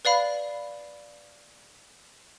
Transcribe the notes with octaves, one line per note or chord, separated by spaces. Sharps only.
B4 D5 F5 B5